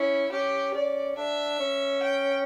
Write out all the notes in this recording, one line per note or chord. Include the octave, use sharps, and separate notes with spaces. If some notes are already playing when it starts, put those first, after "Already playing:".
Already playing: C#4 E4
C#4 G4
C#4 D5
D4 E5
C#4
G5